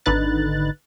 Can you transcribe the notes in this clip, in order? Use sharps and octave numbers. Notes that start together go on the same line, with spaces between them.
G#1 D3 D#4 B4 F#6 A6